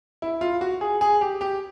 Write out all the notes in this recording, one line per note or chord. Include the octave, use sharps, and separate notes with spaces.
E4
F4
F#4
G#4
G#4
G4
G4